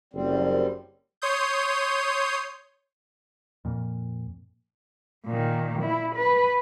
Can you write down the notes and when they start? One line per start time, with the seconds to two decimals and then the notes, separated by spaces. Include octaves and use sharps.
0.13 F#1 F#2 G3 C4
1.22 C#5 C6 D#6 G6
3.65 F2 A#2
5.26 A#2 D#3
5.82 E4
6.16 B4